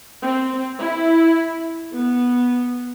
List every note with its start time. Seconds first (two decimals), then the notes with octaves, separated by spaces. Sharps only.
0.23 C4
0.79 E4
1.93 B3